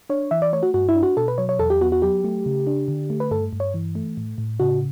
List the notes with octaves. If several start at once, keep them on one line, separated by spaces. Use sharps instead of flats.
D4 C#5
E3 E5
D5
A3 C#5
F#4
G2 F#4
E4
D4
F#4
B2 A4
B4
F#3 C#5
C#5
E2 A4
G4
B3 F#4
F#4
F#3 G4
A3
C#3
D4
D3
A3
B4
G2 A4
G2
C#5
E3
A3
A2
A2
C#3 F#4